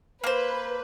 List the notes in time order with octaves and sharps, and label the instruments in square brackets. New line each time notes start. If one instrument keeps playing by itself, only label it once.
[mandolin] A#3 C5 [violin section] B4